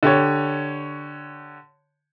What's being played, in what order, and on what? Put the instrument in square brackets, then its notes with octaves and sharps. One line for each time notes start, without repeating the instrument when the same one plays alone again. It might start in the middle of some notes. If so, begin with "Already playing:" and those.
[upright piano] D3 G4 C#5